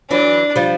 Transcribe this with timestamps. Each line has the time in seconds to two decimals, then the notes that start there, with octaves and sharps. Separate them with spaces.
0.10 E3 F#3 D4
0.56 F3 G3